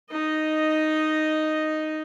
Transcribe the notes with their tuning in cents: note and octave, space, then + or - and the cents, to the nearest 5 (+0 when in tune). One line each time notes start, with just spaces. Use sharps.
D#4 -5 D#5 +0